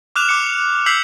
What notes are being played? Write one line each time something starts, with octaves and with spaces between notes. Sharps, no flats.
D6 F6 F#6 E7 F7
D6 C#7
E6 G6 B6 C7 F7 F#7